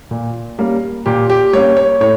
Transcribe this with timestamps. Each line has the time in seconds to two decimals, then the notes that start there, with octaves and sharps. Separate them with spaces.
0.11 A#2
0.59 G3 A#3 C#4
1.06 A#2 G4
1.30 G4
1.53 G3 A#3 C#4 C#5
1.77 C#5
2.01 A2 C#5